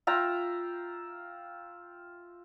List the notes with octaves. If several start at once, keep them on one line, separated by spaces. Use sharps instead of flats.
F4 E5 G5 A#5